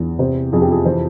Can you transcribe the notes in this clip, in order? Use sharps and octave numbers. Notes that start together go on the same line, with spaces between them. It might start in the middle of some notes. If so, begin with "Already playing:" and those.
Already playing: E2
C3 C5
F2 G#4
G4
G#4
E3 C5